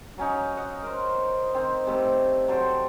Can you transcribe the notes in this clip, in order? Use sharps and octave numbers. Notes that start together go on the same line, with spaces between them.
F#3 C#4 D#4
D#5 F#5
A#4 C5
D#3 C4
C3 G3 A3
F#3 A4 C5 G5